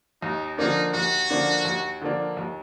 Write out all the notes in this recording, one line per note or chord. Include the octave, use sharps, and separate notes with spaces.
D#2 D#4
D3 F3 A#3 D4 D#4
D#2 F#4
D3 F3 A#3 D4
D#2
D3 F3 A#3 D4
D#2